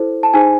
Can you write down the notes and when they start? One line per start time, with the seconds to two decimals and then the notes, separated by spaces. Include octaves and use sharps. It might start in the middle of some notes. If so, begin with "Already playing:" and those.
Already playing: E4 A4 C5
0.23 A5
0.33 D#4 G#4 C5 G#5